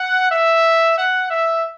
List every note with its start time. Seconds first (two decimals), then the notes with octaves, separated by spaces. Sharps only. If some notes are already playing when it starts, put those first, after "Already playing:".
Already playing: F#5
0.31 E5
0.97 F#5
1.30 E5